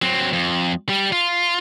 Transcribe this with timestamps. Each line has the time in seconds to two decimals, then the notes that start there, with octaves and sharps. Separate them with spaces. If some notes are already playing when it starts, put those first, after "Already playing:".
0.02 F#3 C4
0.33 F2
0.89 G3
1.12 F4